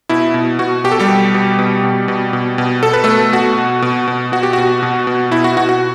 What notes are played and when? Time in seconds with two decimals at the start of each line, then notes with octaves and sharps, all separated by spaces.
0.09 B2 E4
0.34 B2
0.59 B2 F#4
0.84 B2 G4
0.92 A4
1.00 G3 G4
1.08 B2
1.34 B2
1.59 B2
1.84 B2
2.08 B2
2.33 B2
2.58 B2
2.83 B2 A4
2.93 B4
3.04 B2 A3 A4
3.33 B2 F#4
3.58 B2
3.82 B2
4.08 B2
4.32 B2 F#4
4.43 G4
4.53 B2 F#4
4.83 B2
5.07 B2
5.31 B2 E4
5.44 F#4
5.57 B2 F#4
5.69 F#4